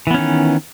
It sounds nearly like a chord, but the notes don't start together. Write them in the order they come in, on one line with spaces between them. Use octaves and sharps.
E3 B3 C#4 D#3